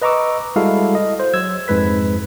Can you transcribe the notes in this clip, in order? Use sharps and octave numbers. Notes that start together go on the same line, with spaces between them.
B4 D#5 A#5 C#6 D6 E6
G3 G#3 E4 F#4 A4 F5
D#5
C5
F#3 E6 G#6
F2 G#2 G#3 B4 B6